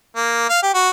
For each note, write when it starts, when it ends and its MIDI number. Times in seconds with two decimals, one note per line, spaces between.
0.16 0.46 58
0.49 0.61 77
0.63 0.71 67
0.74 0.90 66